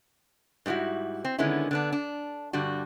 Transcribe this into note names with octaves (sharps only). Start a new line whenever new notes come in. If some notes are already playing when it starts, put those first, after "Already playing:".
G#2 G3 B3 E4 F#4
C4
D3 D#3 G#3 B3 C#4 E4
D3 B3 D4
D4
G2 D3 G3 F#4